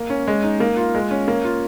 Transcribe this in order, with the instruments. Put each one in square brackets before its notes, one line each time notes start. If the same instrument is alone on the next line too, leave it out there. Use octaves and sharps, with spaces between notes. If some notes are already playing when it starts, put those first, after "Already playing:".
Already playing: [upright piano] A#3
C#4
G#3
D#4
A#3
F4
G#3
C#4
A#3
F4